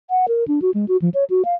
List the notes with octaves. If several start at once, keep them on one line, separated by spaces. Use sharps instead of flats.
F#5
A#4
D4
F#4
G#3
F#4
F3
C#5
F#4
F5